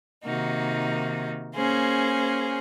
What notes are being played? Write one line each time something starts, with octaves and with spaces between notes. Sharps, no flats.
C3 D#3 A#3 D#4 F#4
A#3 C#4 G#4 C5